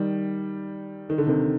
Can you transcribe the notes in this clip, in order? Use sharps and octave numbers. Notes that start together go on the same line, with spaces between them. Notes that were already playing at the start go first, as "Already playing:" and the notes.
Already playing: D#3 G3
D#3
D3
C3 D#3